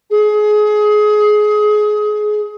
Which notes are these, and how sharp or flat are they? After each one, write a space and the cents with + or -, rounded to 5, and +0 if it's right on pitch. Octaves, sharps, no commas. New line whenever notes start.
G#4 +25